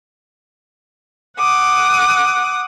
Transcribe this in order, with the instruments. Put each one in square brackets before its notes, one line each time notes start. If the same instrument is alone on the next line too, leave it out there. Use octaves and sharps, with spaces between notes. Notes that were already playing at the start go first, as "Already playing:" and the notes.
[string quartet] F#5 D6 D#6